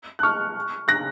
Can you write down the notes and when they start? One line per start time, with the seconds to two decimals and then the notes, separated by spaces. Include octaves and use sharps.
0.19 F#6
0.23 C#6 F6
0.88 F#6 A#6